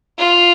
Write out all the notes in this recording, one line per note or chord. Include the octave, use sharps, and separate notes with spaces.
F4